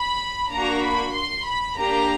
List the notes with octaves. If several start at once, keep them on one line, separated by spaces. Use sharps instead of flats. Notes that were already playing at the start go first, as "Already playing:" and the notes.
Already playing: B5
A#3 D4 F#4 A#5
B5
C6
B5
A#3 D4 G4 A#5